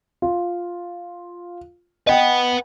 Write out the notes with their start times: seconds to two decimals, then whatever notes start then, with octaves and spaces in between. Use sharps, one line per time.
0.22 F4
2.07 B4 D#5 F#5 G5